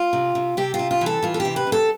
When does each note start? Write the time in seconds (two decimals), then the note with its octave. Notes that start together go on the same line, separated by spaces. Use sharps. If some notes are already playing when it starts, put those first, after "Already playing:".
Already playing: F4
0.13 C3
0.35 C3
0.57 C3 G4
0.74 F4
0.79 C3
0.91 F4
1.01 E3
1.06 A4
1.22 E3 F4
1.34 A4
1.40 G4
1.45 C3
1.56 B4
1.67 C3
1.72 A4